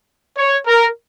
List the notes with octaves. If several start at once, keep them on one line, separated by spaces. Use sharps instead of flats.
C#5
A#4